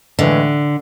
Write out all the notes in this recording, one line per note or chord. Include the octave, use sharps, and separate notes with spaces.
A2 D3 E3 G#3